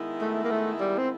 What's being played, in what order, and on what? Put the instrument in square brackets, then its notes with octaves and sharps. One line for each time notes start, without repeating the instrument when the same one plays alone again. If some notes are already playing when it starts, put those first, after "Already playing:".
Already playing: [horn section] D#3 G#3 B3 E4
[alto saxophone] A3
A#3
A3
G3
C4